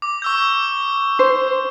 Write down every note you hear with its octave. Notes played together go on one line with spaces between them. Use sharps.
D6
C#6 E6 G6
C5